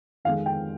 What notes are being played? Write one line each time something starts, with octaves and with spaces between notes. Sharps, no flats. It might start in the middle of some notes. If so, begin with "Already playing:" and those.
F2 D#3 G#3 F5
G5